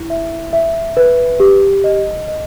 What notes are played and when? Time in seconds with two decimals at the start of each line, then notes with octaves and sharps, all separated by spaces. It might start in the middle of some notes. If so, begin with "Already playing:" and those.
Already playing: E4
0.10 E5
0.53 E5
0.97 B4
1.40 G4
1.84 D#5
2.28 D#5